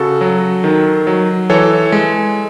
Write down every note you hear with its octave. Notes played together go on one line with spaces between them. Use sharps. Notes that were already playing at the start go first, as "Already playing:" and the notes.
Already playing: C#3 F#4 A4
F#3
D#3
F#3
E3 A4 C#5
G#3